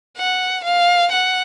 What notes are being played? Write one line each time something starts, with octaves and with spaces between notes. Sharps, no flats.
F#5
F5
F#5